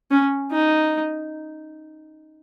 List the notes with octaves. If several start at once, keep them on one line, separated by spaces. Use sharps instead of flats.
C#4
D#4